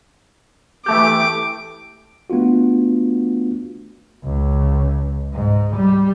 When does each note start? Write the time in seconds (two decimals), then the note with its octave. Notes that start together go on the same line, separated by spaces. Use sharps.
0.86 E3 A3 G4 D6
2.30 A3 B3 D4 F4 F#4
4.25 C#2
5.33 G#2
5.77 G3